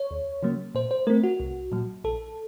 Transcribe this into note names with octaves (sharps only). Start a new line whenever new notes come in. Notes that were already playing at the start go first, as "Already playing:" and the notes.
Already playing: C#5
D#2
C#3 F#3 A#3
A#2 C5
C5
A3 C4 A#4
F#4
C2
A#2 F#3
A#1 A4